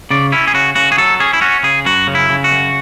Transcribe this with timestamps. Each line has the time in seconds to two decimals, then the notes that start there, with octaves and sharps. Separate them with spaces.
0.11 C#3 D5
0.32 C#4 E4
0.47 G#4
0.54 C#3 F#4
0.76 C#3 F#4
0.92 G#4
0.98 F#3 A4
1.20 C#4 G#4
1.33 E4
1.41 C#4 F#4
1.63 C#3 G#4
1.86 F#2 F#4
2.07 C#3
2.15 E4
2.30 C#3
2.44 F#4
2.51 F#2